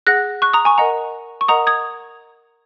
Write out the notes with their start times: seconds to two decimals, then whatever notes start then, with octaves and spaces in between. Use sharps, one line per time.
0.07 G#4 F#5 F#6 A#6
0.42 C#6 F#6
0.53 A#5 D#6
0.65 G#5 C#6
0.78 A#4 D#5 F#5 A#5
1.41 C#6
1.48 A#4 D#5 F#5 A#5 D#6
1.67 D#6 G#6